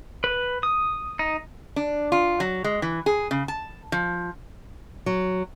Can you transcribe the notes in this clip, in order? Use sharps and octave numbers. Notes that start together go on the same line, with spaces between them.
B4
D#6
D#4
D4
F4
F#3
G#3
E3
G#4
C#3
A5
F3
F#3